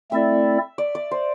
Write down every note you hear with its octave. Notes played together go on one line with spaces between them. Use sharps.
A3 C4 E4 A4 D5 E5
D5
D5
C5